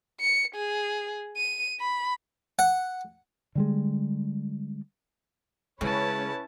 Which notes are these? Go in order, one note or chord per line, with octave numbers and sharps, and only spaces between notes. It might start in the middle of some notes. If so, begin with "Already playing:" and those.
C#7
G#4
D#7
B5
F#5
D3 G3 G#3
C#3 G#3 C#4 E4 B4 C#5 A5